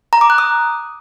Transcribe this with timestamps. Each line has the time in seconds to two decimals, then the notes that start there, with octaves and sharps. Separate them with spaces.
0.13 A#5
0.21 D6
0.30 F#6
0.38 D#6